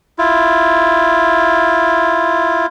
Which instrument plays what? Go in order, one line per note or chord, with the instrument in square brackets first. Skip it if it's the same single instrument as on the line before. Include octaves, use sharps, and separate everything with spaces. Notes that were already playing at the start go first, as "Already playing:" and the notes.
[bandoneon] E4 F4